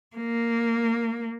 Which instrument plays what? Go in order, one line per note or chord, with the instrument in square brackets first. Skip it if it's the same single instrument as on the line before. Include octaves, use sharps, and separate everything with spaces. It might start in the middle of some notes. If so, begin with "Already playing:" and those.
[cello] A#3